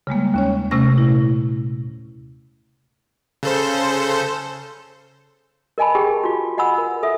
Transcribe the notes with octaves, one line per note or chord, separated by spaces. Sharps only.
C#3 G3 G#3 A#3
D#2 C#4 C#5
C3 A3 C#4 F6 A#6
A#2 E4
C#3 A4 C5
A#4 D#5 G#5 A5 B5
G4 G#4 A#4 G5
F4 F#4
D#5 F#5 G#5 B5 E6
A#4
A4 E5